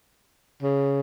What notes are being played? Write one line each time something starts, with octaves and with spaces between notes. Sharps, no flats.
C#3